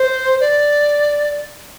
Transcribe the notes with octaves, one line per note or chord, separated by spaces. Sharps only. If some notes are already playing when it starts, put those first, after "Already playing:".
Already playing: C5
D5